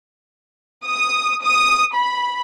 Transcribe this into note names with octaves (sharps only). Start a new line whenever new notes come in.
D#6
D#6
B5